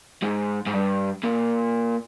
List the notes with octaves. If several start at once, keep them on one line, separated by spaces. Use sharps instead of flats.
G#2
G#2
G2
A#2